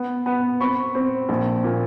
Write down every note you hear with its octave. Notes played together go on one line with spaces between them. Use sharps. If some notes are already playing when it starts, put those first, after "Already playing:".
Already playing: B3
B3
C4 B5 C#6
C4
A#1
A#2